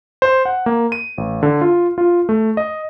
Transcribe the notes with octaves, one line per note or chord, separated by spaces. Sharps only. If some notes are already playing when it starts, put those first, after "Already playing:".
C5
F#5
A#3
D#7
A1
D3
F4
F4
A3
D#5